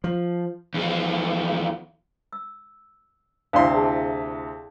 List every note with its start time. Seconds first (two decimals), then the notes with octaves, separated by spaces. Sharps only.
0.04 F3
0.74 E2 F3
2.33 E6
3.53 D2 C3 E4 D5 F5 C6
3.74 G#4 A5